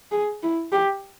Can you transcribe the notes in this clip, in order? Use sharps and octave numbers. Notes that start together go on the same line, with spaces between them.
G#4
E4
G4